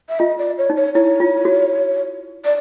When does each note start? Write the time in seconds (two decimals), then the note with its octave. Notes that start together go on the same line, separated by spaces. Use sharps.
0.09 E5
0.19 F4 D#5
0.39 D5
0.58 C#5
0.70 D#4
0.76 C#5
0.95 E4 C#5
1.20 F4
1.45 F#4
2.45 D5